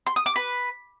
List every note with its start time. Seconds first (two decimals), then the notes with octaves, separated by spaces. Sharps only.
0.07 C6
0.16 D#6
0.26 D6
0.36 B4